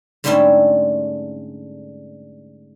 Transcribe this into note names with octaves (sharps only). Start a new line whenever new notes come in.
G#2 D3 G3 A3 C4 C#4